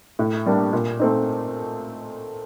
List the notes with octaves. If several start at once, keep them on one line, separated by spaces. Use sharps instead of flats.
A2
G3 A#3 D4
A#2
A3 C4 D#4